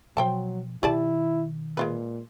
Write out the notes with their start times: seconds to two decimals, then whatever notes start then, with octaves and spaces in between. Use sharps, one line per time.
0.17 B2 F3 F#3 C5 G5 A5
0.83 B2 D#3 E4 G4 D5 A5
1.77 A#2 G#3 F4 B4